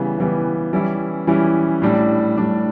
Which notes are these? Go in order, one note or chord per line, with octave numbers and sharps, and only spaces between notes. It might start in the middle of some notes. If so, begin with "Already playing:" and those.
Already playing: C#3 E3 G3 B3
C#3 E3 G3 B3
E3 G3 C#4 E4
E3 G3 C#4 E4
A2 G3 D4
A2 G3 D4